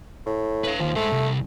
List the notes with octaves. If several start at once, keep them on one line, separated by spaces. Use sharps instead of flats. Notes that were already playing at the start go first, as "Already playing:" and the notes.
A2
B4 F5
D#2 F3
G#3 A3 C5
C2